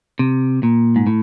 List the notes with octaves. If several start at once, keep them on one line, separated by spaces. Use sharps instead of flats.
C3
A#2
G#2
A2